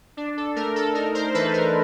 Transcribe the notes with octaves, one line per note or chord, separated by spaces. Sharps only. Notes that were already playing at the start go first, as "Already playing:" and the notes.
D4
A4
A3 A#4
A4
D#4 A#4
A#4 C5
E3 A4 B4
A#4